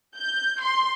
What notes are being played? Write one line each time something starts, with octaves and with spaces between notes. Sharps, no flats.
G6
C6